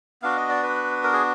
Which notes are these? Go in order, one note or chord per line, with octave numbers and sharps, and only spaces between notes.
B3 D4 F#4 F5
D#5
D5
B4
A#4
G#4